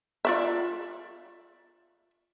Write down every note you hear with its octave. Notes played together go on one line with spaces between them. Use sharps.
F4 D5 E5